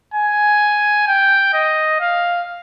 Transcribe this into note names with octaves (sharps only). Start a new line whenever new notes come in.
G#5
G5
D#5
F5